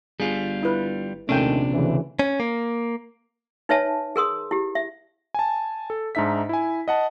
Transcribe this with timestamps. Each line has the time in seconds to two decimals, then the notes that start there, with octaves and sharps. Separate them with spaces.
0.20 G1 G3 F4 G#4
0.63 E4 B4
1.29 A#1 D#2 C3 D#3 A3 C#4 D4 G5
1.73 D2 C#3 E3
2.19 C#4
2.40 A#3
3.69 D#4 B4 C#5 E5 G#5 A5
4.16 G#4 A#4 C6 D#6
4.51 E4 G4
4.75 E5
5.34 G#5 A5
5.90 A4
6.15 G#2 D4 D#4 E5 B6
6.49 E4 G#5
6.88 D#5 F#5 A5